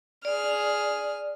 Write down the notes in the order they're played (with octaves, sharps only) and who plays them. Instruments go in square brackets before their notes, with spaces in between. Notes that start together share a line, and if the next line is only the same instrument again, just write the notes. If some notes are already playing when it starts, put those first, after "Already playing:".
[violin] G#4 F6 [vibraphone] D5